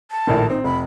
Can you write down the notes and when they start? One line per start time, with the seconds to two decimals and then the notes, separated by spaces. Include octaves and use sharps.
0.11 A5
0.27 A#1 A2 D#3
0.50 C4 D#4
0.64 F1 B5